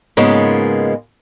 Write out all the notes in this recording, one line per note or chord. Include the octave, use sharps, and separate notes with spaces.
G#2 C#3 G#3 A#3 B3 F4